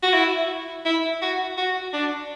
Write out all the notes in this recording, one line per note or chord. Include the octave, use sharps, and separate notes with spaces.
F#4
E4
E4
F#4
F#4
D4